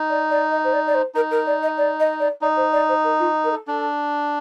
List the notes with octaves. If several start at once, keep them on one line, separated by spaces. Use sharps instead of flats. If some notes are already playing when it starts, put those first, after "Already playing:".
Already playing: D#4
D5
D5
D#5
C5
D5
D5
C5
D#4 A#4
A#4
D5
D#5
D5
D#5
D5
D#4 D5
C5
D5
C5
A#4
F4
A#4
A4
D4 A4